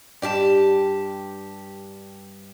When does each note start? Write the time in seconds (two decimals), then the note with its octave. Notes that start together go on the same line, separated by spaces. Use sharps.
0.22 G2 G4 A4 A5